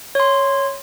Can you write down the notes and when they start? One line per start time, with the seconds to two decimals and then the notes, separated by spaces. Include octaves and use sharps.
0.15 C#5 C6